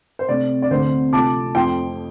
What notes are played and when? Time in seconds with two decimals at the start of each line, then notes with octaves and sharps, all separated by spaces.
0.19 C5
0.29 C3 A3 C4 D5
0.62 D5
0.71 D2 D3 A3 C4 C5
1.13 C3 F3 A3 A5 D6
1.55 F2 F3 A3 G5 C6